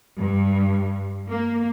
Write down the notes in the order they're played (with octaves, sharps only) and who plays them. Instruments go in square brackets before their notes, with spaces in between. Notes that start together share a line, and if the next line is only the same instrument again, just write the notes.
[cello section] G2
A#3